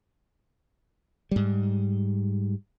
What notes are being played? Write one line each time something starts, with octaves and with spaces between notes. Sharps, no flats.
G#2 G3